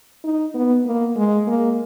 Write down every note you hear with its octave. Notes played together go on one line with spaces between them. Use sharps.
D#4
B3
A#3
G#3
A#3